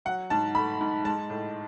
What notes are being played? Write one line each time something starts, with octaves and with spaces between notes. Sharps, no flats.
F#3 F#5
G#2 A5
A3 B5
G#2
G#3 A5
A2